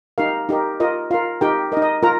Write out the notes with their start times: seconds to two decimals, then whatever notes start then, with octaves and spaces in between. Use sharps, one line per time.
0.18 D#4 G4 A#4 F5
0.49 D#4 G4 A#4
0.80 F4 A#4 D#5
1.11 F4 A#4 F5
1.41 D#4 G4 A#4 G5
1.72 A#4 D#5
1.77 D#4
1.82 D#5
2.03 F4 A#4 A#5